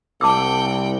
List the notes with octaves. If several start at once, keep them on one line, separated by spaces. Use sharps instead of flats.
C2 F#5 G5 A5 D6 E6